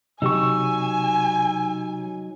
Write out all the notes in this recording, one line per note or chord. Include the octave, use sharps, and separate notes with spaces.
C3 F#3 D#4 G4 G#5 C#6 E6